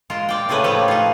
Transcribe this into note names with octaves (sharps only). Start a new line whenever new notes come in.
G#3 F4 A#4
F4 D5 G5
A2 C#3 A3 G#4 B4
F3 A3 D#4 E4 G4 B4
D#4 F4